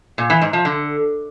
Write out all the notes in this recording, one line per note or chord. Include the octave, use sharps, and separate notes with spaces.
A#2
E3
G#2
F3
D3